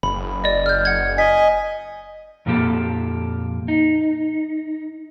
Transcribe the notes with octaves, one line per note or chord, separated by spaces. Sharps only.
F#1 B5
D5 D#5
F6 G6
F#5 G#6
D#5 G#5 B6
F2 A#2 F3 A#3 G4 A4
D#4